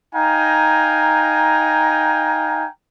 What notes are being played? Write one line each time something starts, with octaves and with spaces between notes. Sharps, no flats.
D#4 F5 G5 G#5 A#5